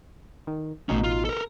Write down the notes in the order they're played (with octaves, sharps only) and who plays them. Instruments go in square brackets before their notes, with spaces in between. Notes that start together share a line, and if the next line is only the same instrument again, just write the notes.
[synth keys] D#3
[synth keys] A1 B2 D#4 [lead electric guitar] A3 C#4
[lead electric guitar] F4
A4 A#4